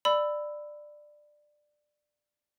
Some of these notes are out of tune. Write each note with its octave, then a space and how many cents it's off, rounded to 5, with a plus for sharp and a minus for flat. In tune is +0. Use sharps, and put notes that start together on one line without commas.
D5 +15 B5 +15 E6 +0